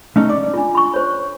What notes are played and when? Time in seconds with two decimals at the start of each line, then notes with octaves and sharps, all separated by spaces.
0.16 A3 C#4 D#4
0.29 D5
0.54 D4 F4
0.75 B5 C#6
0.94 C5 C#5